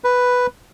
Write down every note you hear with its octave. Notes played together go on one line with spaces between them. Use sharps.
B4